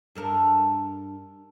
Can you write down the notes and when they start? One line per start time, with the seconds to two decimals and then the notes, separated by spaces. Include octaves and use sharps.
0.15 G2 A4 A#4